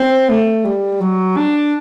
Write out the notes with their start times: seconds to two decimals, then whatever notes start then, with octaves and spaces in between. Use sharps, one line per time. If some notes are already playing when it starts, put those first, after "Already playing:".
Already playing: C4
0.29 A3
0.65 G3
1.01 F#3
1.37 D4